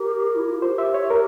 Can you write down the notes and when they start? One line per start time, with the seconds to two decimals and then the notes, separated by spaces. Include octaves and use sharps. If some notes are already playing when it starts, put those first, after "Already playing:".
Already playing: G4 A#4
0.35 E4
0.48 F4
0.62 G4 C5
0.78 E5
0.94 C#5
1.10 A#4